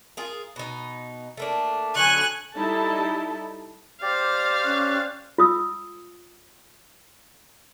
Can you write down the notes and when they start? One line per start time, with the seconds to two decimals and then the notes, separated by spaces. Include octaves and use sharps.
0.17 F4 G#4 A#4
0.56 B2 D#4
1.37 A3 A#3 D4
1.95 D3 F#3 B3 G#5 C#6 F#6
2.55 G3 D#4 E4 A4 A5
4.02 G4 C5 D5 F5
4.64 C#4 C#6 F#6
5.38 F4 D#6 E6